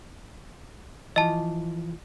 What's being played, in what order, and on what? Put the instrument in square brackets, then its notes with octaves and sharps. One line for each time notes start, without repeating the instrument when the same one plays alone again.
[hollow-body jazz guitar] E3 F3 [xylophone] D#5 A5